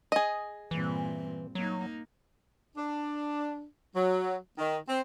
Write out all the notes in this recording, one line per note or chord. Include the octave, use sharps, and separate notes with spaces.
G#4 D#5
G2 A#2 E3 C4
F#3 A#3 D#4
D4
F#3
D#3
C4